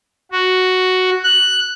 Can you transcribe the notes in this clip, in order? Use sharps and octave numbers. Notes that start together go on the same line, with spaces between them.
F#4
F#6